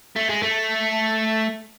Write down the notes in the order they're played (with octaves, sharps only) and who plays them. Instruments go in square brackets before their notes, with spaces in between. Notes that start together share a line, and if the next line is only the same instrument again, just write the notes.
[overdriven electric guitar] A3
G#3
A3